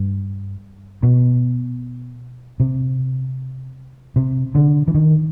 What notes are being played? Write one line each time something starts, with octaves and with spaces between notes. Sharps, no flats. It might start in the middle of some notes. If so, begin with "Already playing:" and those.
Already playing: G2
B2
C3
C3
D3
E3
D#3